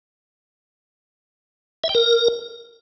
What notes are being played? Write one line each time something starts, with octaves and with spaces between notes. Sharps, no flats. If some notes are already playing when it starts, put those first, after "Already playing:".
E5
G5
A#4